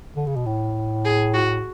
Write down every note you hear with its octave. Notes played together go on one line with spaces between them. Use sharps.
D3
C#3
B2
A2
G#4
F#4